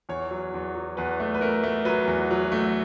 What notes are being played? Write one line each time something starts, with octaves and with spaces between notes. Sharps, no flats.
E2 C#5
F#3
E2
F#3
E2 B4
A3
B4
A3 A#4
A3
F#3 B4
E2
F#3
A3